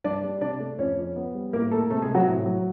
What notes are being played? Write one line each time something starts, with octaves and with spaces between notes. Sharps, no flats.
G2 D4 D5
G3
C3 D4 D5
A3
F2 C#4 C#5
F3
B3
G3
A2 A#3 A#4
A3 A#3 A4
C3 A3 A4
G#3 G#4
C3
F#3 F#4
A2
F#3